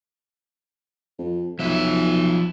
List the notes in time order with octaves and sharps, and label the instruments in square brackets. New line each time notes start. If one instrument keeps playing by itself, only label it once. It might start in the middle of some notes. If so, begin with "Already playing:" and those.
[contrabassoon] F2
[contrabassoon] B1 [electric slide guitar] F3 E5